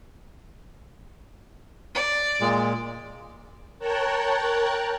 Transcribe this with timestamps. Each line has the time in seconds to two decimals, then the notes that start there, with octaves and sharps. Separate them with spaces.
1.95 D5
2.41 A#2 G#3
3.79 A#4 C#5 G5 A5 A#5 F#6